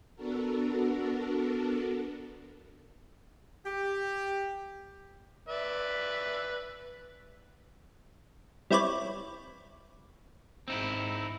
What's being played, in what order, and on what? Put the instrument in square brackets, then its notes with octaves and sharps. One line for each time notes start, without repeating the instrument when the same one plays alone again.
[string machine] B3 D4 F#4 A4 A#4
[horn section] G4
[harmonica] B4 D5 E5
[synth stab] G3 C4 E4 B4 C#5 D5
[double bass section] G#1 G#2 [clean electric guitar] C4 D#4 E4